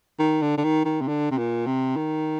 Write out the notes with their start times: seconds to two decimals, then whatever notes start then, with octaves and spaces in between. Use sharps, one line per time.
0.19 D#3
0.42 D3
0.58 D3
0.64 D#3
0.85 D#3
1.01 C3
1.08 D3
1.31 C3
1.38 A#2
1.67 C3
1.96 D#3